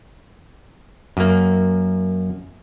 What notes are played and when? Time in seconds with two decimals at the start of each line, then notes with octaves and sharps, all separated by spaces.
1.17 F#2 A#3